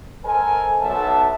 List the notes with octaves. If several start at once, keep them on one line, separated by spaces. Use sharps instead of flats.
A4 A#4 C5 D#5 G#5
B1 E5 F#5 A5